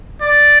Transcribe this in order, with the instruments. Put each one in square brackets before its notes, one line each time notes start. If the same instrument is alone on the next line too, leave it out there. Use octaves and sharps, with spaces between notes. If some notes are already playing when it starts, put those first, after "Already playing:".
[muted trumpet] D5